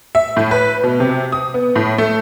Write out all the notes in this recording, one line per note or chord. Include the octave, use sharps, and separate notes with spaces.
E5
A2
B4
B2
C3
D#6
B3
A2
A3